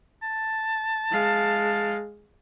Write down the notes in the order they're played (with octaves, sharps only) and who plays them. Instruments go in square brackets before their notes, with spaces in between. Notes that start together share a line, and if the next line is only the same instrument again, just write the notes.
[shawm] A5
[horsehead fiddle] G#3 F5